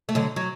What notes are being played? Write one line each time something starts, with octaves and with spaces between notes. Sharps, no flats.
A3
D3 F#3
F#3